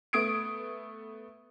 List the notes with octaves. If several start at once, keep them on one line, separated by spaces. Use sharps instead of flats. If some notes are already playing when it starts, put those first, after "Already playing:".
A3 B3 D#6 G#6 D7